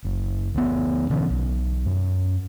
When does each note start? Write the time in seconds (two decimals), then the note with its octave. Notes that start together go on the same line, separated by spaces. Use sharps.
0.05 F#1
0.55 D2 B3
1.10 B2 D3 E3 C#4
1.30 B1
1.85 F#2